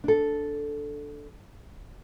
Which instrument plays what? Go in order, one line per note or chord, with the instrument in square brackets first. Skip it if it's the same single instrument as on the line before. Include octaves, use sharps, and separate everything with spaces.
[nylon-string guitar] D4 A4